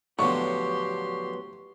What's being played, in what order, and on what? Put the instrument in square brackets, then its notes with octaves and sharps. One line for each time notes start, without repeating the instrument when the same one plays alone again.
[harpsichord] A2 D3 F3 [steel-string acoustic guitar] F#3 B3 [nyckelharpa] G4 C6 [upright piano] C#6